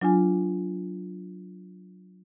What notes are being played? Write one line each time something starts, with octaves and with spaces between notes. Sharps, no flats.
F#3 D4 F4 G#5